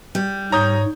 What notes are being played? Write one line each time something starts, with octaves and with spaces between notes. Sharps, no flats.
G3
G#2 C#5 A#5 D#6 G6